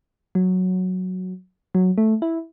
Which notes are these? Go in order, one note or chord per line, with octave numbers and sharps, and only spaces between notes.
F#3
F#3
A3
E4